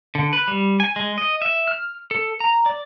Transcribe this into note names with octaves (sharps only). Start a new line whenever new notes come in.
D3
B4
G3
G#5
G#3
D#5
E5
F6
A4
A#5
D5